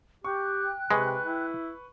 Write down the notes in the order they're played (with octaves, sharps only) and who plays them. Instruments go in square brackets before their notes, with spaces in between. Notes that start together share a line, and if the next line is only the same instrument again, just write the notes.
[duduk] G4 [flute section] G5 F#6 [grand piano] C#6
[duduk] C3 [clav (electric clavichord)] G#3 [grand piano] B4 C#6
[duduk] E4